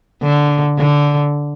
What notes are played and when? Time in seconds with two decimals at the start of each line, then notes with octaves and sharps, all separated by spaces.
0.22 D3
0.78 D3